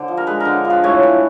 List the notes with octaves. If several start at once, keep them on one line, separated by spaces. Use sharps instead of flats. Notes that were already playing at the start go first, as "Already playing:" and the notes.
Already playing: D3 C5
F3
A#4
G#3 B4
D3 A#4
F3
B4
A2 C#5
E3